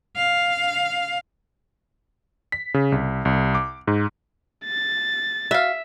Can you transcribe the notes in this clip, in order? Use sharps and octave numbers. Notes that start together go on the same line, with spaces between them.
F5
B6
C#3
C2
C2
D6
G#2
A6
F#4 E5 F5